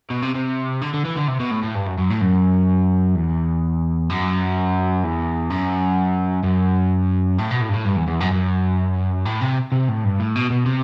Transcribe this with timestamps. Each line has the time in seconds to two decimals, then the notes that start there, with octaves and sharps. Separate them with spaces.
0.10 B2
0.22 C3
0.35 C3
0.81 D3
0.93 D3
1.05 E3
1.16 D3
1.28 C3
1.40 B2
1.51 A2
1.63 A2
1.75 G2
1.87 F#2
1.98 F#2
2.10 A2
2.21 F#2
3.15 E2
4.09 F#2
5.03 E2
5.50 F#2
6.43 F#2
7.38 A2
7.50 B2
7.61 A2
7.69 G2
7.73 A2
7.85 G2
7.96 E2
8.08 E2
8.20 F#2
8.31 F#2
9.26 A2
9.41 C3
9.72 C3
9.89 A2
10.04 G2
10.20 A2
10.36 B2
10.50 B2
10.66 C3